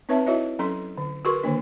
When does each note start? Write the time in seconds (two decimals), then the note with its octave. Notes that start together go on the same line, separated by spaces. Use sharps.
0.09 C4 D#4 B4 C#5 E5 A5
0.27 E4 F#4 C#5 D#5 E5
0.59 F#3 C#4 A4 C6
0.98 D3
1.25 F#4 G#4 A#4 B4 C6 C#6
1.44 D3 D#3 A#3 D4